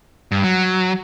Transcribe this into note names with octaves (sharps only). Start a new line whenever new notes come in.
G2
F#3